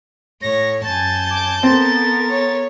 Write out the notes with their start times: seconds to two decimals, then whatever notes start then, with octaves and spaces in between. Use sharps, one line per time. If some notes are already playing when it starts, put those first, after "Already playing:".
0.42 A2 C#5 A#6
0.84 F#2 G#5 A5 G6 A6
1.30 D6
1.63 B3 C4 A4 A#4 A6
2.30 C#5